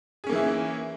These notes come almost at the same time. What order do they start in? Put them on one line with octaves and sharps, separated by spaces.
G#4 C#4 A#3 E3 E4